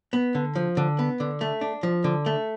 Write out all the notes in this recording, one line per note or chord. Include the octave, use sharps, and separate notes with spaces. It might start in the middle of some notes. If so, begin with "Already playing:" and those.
B3
D3
F3
D3
B3
D3
A3
D4
F3
D3
A3